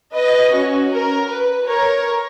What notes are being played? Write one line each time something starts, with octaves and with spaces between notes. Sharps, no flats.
B4 D#5
C#4 F#4
A#4
B4
A#4 C#5